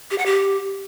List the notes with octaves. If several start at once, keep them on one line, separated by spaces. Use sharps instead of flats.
G4
F#5
G4